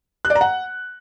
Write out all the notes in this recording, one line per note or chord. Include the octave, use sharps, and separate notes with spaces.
F#6
D5
A#5
F#5